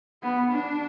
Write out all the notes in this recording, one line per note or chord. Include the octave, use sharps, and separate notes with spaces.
B3
D4